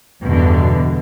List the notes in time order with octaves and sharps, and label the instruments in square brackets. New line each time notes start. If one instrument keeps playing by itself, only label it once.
[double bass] E2 G2 [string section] B2 D3